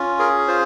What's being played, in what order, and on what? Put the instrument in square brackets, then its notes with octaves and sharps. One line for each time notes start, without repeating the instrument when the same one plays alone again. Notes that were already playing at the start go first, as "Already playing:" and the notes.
Already playing: [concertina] C#4 F4
G#4 A#4
F4 C5